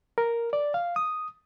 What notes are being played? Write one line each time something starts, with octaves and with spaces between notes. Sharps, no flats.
A#4
D5
F5
D#6